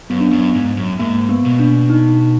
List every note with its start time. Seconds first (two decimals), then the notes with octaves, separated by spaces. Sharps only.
0.10 F#2 B3
0.21 D4
0.31 F#2 B3
0.55 G#2
0.77 F#2
0.99 G#2 A#3
1.29 B3
1.45 B2
1.59 D4
1.89 D#4